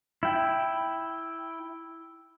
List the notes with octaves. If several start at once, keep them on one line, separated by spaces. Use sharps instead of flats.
E4 G5